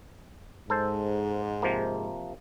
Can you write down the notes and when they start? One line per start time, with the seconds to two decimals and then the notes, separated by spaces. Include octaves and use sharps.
0.70 G#2 A4 C5
1.62 C3 F3 A#3